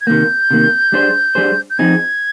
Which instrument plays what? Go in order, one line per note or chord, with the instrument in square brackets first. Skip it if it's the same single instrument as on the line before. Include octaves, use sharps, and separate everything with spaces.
[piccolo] G#6
[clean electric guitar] C3 D#3 A#3 [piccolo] G6
[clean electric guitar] C3 D#3 A#3
G3 D4 G#4 C5
G3 D4 G#4 C5
[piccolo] G6
[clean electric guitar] F3 C4 D#4 G#4 [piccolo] G#6